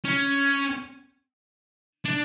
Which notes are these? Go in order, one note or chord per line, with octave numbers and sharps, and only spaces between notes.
C#4
D4